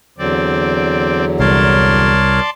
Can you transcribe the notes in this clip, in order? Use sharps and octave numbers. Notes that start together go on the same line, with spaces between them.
E2 D3 F#3 C4 D5
C2 A#4 C#5 D5 A5 C6